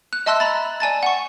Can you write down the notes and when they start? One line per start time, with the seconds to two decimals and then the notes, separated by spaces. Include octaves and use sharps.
0.13 F#6
0.26 D#5 E5 A5 C6 E6 F#6
0.40 A#5 B5 A6
0.80 D5 G#5 A5 A6
1.03 F#5 C#6